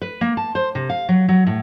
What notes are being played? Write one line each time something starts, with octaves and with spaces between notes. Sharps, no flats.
B4
A#3
A5
C5
C3
F5
F#3
F#3
A2